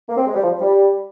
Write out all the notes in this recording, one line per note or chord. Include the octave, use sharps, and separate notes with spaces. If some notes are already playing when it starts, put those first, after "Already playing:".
A#3
C4
G#3
G3
F3
G3